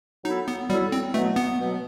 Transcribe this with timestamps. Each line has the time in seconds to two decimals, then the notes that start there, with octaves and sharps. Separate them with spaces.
0.25 F#3 B3 D#4 E4 A4
0.48 B3
0.70 F#3 G3 B3 E4 A4
0.92 C4
1.14 B2 F#3 A3 B3
1.36 B3
1.59 B2 F#3 B3